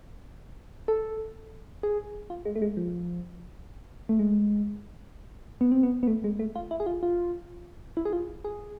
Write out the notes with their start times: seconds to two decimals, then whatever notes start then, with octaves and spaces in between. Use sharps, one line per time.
0.88 A4
1.83 G#4
2.30 F4
2.45 G#3
2.56 A3
2.62 G#3
2.77 F3
4.09 A3
4.19 G#3
5.61 B3
5.72 C4
5.83 B3
6.03 B3
6.07 A3
6.24 G#3
6.39 A3
6.55 F4
6.71 E4
6.80 G#4
6.86 F4
7.03 F4
7.97 E4
8.05 G#4
8.13 F4
8.45 G#4